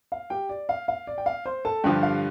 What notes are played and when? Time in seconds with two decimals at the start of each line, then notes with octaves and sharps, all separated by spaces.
0.12 F5
0.30 G4 G5
0.49 D5
0.69 F5
0.88 F5
1.07 D5
1.18 G5
1.26 F5
1.46 C5 C6
1.65 A4 A5
1.84 G2 D3 F3 G4 G5
2.03 F5